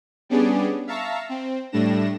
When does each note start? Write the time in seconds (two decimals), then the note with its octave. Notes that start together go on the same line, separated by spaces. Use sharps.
0.29 G3 B3 C#4 D4 G#4 D5
0.87 E5 F5 A5 A#5 C#6 E6
1.29 C4
1.72 A2 G3 A3 D4 A#6 E7